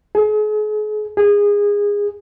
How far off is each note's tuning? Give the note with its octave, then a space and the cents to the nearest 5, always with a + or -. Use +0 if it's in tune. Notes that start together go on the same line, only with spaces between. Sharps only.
G#4 +40
G#4 -20